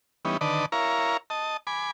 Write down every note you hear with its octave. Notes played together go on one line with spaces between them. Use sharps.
E3 G3 B3 C#4 D#4
D3 D#3 B4 D5 D#5 A5
E4 A#4 C#5 F5 A#5
D#5 A5
G#5 B5 D6